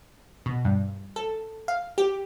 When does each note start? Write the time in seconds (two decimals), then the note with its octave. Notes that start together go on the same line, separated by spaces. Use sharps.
0.46 B2
0.65 G2
1.16 A4
1.68 F5
1.98 G4